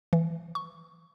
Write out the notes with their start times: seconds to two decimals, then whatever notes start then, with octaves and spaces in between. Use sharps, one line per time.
0.13 E3
0.55 C#6